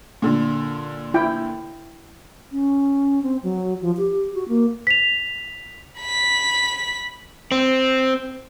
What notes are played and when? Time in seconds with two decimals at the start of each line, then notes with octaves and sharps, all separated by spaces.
0.22 A#2 D3
1.14 E4 G5
2.52 C#4
3.23 C4
3.43 F#3
3.82 F3
3.97 G4
4.34 F#4
4.48 A#3
4.87 B6 F7
6.01 B5 B6
7.52 C4